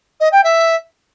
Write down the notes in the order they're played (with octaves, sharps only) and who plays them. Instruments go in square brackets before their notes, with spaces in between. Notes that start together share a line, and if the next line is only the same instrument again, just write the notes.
[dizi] D#5
G5
E5